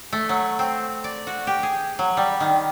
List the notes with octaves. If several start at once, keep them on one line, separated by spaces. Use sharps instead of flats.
A3
F#3
C4
D5
F#4
G4
G#4
F#3
G3
D#3